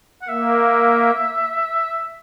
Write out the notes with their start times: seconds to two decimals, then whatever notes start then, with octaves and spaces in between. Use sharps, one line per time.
0.22 F#5
0.29 A#3 E5